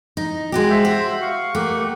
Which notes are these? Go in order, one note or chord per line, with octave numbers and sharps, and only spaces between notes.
D#4
G#3 F#4 G4
C5 E5
F#4
F5 C#6
A3 A#3 G4 F#5